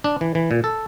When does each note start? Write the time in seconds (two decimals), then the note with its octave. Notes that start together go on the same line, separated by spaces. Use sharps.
0.04 D4
0.21 E3
0.35 E3
0.51 A#2
0.64 A4